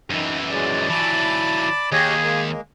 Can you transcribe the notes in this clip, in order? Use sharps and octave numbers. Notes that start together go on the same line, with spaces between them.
F#2 D#3 E3
F#3 G#3 D5
E3 F#3 A5 B5 D6
D#2 G4 G#4 C#5 D#5
G#3 A#3